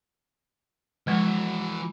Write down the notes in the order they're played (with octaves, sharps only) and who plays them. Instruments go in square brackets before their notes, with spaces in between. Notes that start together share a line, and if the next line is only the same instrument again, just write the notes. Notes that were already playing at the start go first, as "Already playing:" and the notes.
[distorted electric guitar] E3 F#4 [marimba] F3 G#3